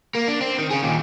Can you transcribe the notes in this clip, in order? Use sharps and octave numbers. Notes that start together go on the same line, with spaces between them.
A#3
D4
C4
D#3
C#4 G#4
D#2 A#2